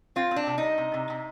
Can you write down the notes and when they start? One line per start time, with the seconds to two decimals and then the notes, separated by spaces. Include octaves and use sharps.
0.16 C4 F4
0.31 C4
0.36 D4
0.47 C3
0.58 D#4
0.63 G3
0.78 C3
0.94 C3
1.10 C3